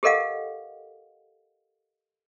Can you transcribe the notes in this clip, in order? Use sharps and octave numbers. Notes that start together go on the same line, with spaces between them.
G4 A4 A#4 D#5 F5 F#5